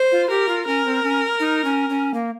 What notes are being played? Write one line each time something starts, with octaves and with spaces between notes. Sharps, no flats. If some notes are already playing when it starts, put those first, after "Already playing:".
Already playing: C5
F4
G4 A#4
F4
C#4 A#4
C4
C#4
D#4
C#4
C#4
A#3